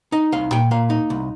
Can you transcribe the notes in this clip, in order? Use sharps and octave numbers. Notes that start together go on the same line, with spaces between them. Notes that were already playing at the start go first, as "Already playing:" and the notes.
D#4 D#5
C2 F5
A#2 G5
A#3 F5
D#4
C2